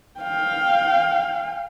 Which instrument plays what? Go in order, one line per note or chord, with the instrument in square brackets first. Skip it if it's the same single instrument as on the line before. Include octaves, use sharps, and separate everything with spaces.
[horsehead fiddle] F5 G5